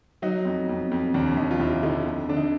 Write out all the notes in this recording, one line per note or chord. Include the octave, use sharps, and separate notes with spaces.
F#3 D#4
F2
F2
F2
D#2 D4
D#2 D#4
F4
D#2 E4
D3 D#4
F2
D3 D4
D#4